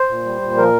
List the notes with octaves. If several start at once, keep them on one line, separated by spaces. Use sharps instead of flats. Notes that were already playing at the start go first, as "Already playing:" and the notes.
Already playing: C5
A#2
G3
A#2
F3 A#4